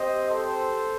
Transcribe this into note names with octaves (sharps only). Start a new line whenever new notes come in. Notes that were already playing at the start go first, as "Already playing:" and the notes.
Already playing: C4 G4 C5 D#5
A4 C5